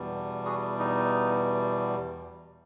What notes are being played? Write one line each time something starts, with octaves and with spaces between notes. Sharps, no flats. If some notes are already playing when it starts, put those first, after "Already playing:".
Already playing: E2 B2 G3
F#4 G#4
D#4